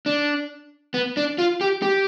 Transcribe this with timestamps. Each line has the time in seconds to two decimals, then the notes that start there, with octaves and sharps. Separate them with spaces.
0.06 D4
0.94 B3
1.17 D4
1.38 F4
1.61 G4
1.82 G4